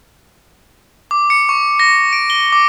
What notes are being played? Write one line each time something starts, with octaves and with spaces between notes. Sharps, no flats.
D6
C#7
C#6
A#6
D7
G7
D6